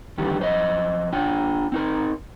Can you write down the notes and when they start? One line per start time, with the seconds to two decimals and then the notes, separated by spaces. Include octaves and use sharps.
0.18 E2 G2 D3 D#3 G4
0.39 F2 C5 D#5
1.13 D4 F4 G5
1.72 C4 D#4 A#4